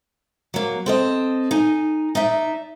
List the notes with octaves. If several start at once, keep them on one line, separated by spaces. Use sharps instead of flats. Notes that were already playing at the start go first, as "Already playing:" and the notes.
F#3 A#3
C4 A4 D#5
D#4 G#5
D#4 D5 E5